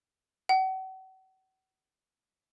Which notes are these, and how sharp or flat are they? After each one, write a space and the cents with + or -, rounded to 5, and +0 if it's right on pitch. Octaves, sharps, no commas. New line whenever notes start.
F#5 +40